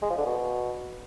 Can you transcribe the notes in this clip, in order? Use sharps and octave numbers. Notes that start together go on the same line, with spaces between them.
G#3
F3
D3
B2